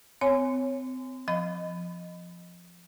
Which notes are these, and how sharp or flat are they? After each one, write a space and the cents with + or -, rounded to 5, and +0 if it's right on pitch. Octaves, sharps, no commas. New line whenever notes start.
C4 -30 C#5 -10 G#5 +0
F3 +0 D#5 +0 B5 +20